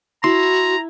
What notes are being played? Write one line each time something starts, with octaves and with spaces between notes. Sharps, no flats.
E4 F#4 A#5 C6